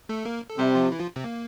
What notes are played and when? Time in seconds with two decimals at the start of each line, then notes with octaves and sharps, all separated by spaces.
0.09 A3 A4
0.25 A#3 A#4
0.50 A4
0.58 C3 G3 G4
0.75 F3 F4
0.92 E3 E4
0.99 F3 F4
1.16 C3 C4
1.24 A#3